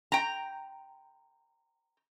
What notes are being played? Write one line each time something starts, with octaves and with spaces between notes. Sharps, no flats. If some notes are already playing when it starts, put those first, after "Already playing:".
G5 A#5